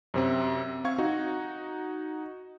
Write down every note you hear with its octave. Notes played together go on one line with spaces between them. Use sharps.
F#2 C3 C4
C4 F5 C#6 G#6
D#4 F#4